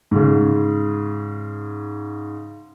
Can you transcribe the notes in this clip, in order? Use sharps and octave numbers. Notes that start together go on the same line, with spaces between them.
G#2 C#3